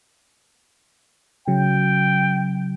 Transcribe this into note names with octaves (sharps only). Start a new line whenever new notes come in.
C#3 F#3 G5